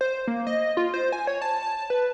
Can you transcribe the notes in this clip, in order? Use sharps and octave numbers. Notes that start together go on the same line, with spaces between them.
C5
A#3
D#5
F4
C5
G#5
C#5
A5
A5
B4